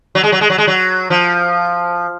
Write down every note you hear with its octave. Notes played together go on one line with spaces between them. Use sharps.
F#3
G#3
F#3
G#3
F#3
G#3
F#3
F3